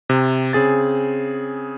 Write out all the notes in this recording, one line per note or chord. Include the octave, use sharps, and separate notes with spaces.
C3
C#3 C4 G#4 A6